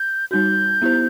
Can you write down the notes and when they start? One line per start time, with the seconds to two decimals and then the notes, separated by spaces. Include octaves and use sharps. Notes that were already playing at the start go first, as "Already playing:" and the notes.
Already playing: G6
0.31 G3 D#4 F#4 G6
0.82 B3 E4 G4 C5